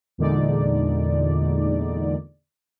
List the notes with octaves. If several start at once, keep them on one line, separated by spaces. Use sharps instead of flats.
E2 A#2 D3 G#3 D#4 D5